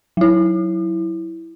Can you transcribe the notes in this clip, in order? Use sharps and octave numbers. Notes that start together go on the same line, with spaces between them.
F#3 E4